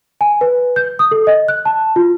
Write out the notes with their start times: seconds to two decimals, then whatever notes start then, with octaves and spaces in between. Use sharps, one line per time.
0.21 G#5
0.41 B4
0.76 G6
0.99 D#6
1.12 A4
1.27 D#5
1.48 F#6
1.65 A5
1.96 F4